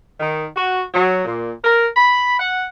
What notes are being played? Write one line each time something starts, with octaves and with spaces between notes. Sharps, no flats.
D#3
F#4
F#3
A#2
A#4
B5
F#5